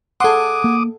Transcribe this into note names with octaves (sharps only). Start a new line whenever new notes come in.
G#4 A4 F#5 C6 D6 D#6
A#3